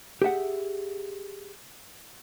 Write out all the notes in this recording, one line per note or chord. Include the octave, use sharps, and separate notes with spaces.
G4 G#4 E5 F#5